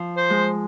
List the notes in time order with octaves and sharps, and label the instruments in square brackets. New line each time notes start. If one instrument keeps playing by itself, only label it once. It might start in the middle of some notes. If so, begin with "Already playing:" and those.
Already playing: [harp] F3
[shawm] C5
[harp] G#3